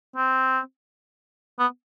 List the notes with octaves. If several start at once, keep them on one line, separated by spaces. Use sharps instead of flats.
C4
B3